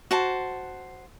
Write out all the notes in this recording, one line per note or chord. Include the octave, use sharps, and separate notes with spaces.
F#4 C5 A5